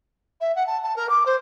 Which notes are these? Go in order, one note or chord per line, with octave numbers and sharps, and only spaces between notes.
E5
F#5
A5
A5
A#4
D6
C5